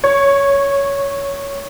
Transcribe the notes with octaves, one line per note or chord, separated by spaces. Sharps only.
C#5